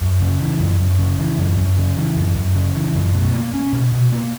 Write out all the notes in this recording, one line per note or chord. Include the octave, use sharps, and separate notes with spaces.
F#2
C#3
E3
F#2
F#2
C#3
E3
F#2
F#2
C#3
E3
F#2
F#2
C#3
E3
F#2
B2
A#3
C#4
B2
B2
A#3